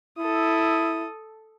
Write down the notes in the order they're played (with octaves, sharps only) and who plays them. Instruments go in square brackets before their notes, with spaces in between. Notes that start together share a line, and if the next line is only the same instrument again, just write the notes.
[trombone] E4 [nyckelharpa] A4 D#6